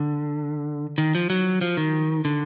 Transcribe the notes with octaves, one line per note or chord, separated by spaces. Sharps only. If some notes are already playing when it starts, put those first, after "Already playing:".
Already playing: D3
D#3
F3
F#3
F3
D#3
D3